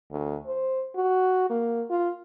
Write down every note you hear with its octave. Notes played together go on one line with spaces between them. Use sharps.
D2
C5
F#4
A#3
F4